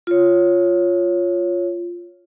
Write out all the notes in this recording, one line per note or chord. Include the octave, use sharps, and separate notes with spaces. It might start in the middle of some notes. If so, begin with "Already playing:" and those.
F4 C#5